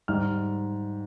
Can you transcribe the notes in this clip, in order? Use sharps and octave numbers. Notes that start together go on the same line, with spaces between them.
G#2 G3 F6